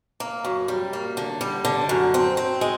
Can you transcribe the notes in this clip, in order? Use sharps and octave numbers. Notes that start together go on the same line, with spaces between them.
A#3
F#2
G3
A#3
D3
G3
D3
F#2
C4
C4
G#3